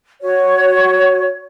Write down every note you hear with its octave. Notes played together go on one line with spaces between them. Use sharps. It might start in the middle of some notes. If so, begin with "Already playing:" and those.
F#4 C#5